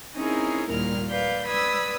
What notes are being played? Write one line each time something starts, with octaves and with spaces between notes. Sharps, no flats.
C4 C#4 D#4 E4 G#4 A#4
D#2 A#2 G3 A#4 F6
B4 D5 F5 G6
B4 D5 B5 D#6 E6 G#6